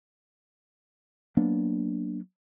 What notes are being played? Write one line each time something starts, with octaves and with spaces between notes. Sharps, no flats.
F#3 A#3 B3 D4